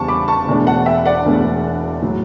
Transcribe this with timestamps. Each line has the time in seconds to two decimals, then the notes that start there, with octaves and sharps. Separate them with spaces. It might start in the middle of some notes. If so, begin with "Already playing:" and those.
Already playing: E2 C#3 G3 A5 C#6
0.08 B5 D6
0.28 A5 C#6
0.47 E1 E2 B2 A3 D4
0.67 F#5 A5
0.86 E5 G5
1.05 D5 F#5
1.25 E1 E2 B2 A3 D4
2.02 A2 F#3